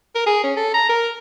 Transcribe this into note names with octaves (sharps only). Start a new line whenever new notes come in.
A#4
G#4
C#4
A4
A#5
A#4